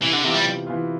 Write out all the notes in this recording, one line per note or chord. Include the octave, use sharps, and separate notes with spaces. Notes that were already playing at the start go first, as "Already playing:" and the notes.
C3 E3
D3
C3 E3 B3 F4
G3
C3
E3 B3 F4